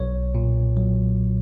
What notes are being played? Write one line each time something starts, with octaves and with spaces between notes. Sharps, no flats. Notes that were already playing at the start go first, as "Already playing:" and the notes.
Already playing: B1 C#5
A#2
F#3